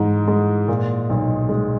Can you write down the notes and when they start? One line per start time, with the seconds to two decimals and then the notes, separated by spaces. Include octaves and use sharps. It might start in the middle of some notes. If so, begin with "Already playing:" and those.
Already playing: G#2 E3 G#3
0.28 G#3
0.68 A#2
1.09 B1
1.49 G#3